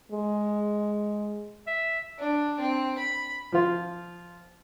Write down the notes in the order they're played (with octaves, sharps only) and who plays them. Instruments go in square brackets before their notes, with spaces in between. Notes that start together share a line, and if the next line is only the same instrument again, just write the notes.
[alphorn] G#3
[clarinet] E5
[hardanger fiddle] D4
C4
B5
[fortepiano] F3 F4